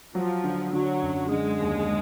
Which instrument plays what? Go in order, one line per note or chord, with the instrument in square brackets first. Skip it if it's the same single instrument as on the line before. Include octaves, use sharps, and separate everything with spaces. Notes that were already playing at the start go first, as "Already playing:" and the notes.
[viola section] F3 [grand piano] F#3
[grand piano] D3
[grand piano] D3 [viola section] F#3
[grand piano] F#2
[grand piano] D3 [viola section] G#3
[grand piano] D#2